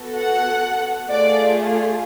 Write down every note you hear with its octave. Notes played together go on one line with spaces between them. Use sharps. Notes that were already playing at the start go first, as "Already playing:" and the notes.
Already playing: B3 F#4 A4
F#5
A3 F4 G#4 D5